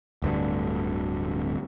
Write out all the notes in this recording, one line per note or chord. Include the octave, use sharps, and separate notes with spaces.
D1 D2 G2 D3